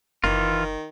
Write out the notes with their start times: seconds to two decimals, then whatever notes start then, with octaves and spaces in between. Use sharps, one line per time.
0.24 F#1 D#3 E3 F4